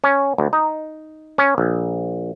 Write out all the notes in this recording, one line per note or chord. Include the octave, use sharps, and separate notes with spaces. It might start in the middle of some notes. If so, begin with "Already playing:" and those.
C#4
D2
D#4
C#4
A#1